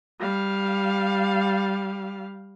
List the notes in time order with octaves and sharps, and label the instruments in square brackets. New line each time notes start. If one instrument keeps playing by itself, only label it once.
[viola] G3 F5